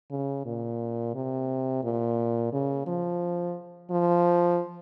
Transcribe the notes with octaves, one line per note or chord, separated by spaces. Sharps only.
C#3
A#2
C3
A#2
C#3
F3
F3